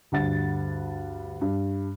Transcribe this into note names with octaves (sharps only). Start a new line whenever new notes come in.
D2 G2 F#5 A6
G2